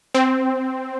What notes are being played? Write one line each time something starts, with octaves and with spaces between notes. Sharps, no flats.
C4